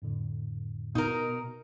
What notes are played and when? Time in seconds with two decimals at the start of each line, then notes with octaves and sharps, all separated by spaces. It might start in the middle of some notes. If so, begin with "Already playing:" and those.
0.02 F2 A2 D3
0.95 B2 D#4 A#4